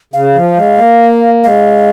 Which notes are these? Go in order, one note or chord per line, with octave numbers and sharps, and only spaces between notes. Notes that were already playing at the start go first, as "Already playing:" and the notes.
C#3 F5
F3
G#3
A#3
G#3 F5